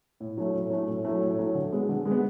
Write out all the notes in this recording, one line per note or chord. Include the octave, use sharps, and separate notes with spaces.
A2
F#3 A3
A2
F#3 A3
A2
F#3 A3
A2
F#3 A3
D3
G#3 B3
D3
G#3
B3